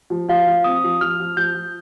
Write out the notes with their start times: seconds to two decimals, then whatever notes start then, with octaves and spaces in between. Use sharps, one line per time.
0.10 F3
0.29 F3 F5
0.47 F3
0.64 C4 D#6
0.84 F3
1.01 F3 F6
1.20 F3
1.37 F3 G6
1.55 F3